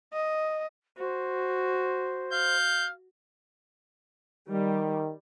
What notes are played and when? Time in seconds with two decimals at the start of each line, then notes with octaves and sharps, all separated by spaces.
0.13 D#5
0.98 F#4 C5
2.33 F5 G6
4.49 D#3 G3